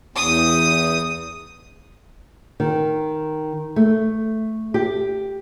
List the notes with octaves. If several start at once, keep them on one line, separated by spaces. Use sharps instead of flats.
E2 D#6
D#3
A3
G4